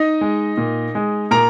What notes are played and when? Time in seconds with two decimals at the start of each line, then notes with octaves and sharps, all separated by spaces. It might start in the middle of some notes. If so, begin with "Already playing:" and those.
Already playing: D#4 D#5
0.21 G#3
0.57 A#2
0.95 G#3
1.31 A#2 A#4 A#5